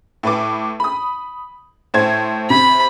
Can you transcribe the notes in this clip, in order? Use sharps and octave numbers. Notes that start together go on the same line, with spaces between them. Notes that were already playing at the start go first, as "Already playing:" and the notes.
A2 B4 D6
B5 D#6
A2 C5 G#6
C3 B5